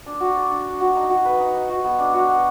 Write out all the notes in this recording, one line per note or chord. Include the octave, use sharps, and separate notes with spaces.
D4
F#4
D5
D4
D4
F#4
D#4
F#4
B4
D#4
D#4
F#4
B3
D4
F#4
B3